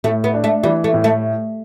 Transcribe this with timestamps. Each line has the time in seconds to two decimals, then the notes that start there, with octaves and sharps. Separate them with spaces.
0.04 A2 A3
0.24 B3
0.34 D4
0.44 A3
0.64 E3 G3
0.84 A3
0.94 A2
1.04 A3